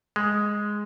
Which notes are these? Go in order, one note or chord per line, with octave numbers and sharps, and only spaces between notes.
G#3